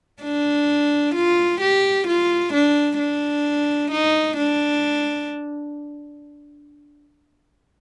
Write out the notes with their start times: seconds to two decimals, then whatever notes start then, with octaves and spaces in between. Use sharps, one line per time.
0.23 D4
1.15 F4
1.61 G4
2.07 F4
2.53 D4
2.99 D4
3.91 D#4
4.37 D4